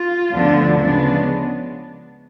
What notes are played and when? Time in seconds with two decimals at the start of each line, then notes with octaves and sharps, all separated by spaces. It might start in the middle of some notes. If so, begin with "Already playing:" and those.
Already playing: F4
0.31 D2 D3 F3 B3 D4
0.79 C#3 F3 G#3 B3 D4